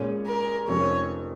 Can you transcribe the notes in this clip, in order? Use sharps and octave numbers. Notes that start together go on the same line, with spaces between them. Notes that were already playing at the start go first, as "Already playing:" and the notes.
Already playing: A#2 G#3 C#4 G#4 C#5
A#4
F1 F2 F3 C#4 A#4 C#5